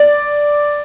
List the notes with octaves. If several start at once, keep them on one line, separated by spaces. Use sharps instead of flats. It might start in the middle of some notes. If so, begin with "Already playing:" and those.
Already playing: D5